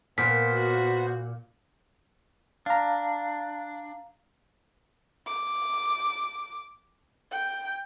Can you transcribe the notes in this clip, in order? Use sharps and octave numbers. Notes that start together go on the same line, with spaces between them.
A#2 B3 C5 B6
F#4
D4 F5 A#5
D6
G5